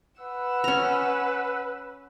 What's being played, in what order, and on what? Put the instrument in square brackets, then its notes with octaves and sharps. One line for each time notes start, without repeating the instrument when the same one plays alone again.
[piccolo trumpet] B4 [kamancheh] F#5 E6
[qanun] C#4 A#5